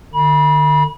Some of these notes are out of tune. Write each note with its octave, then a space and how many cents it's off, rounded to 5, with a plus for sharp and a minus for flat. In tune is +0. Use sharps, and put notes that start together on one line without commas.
D3 +35 B5 -35